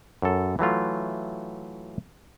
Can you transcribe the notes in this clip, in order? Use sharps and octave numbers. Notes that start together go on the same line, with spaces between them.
F#2 A4
E3 F#3 A3 F4